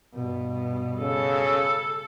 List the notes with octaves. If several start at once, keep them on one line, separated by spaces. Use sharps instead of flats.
G2 B2
C#3 A4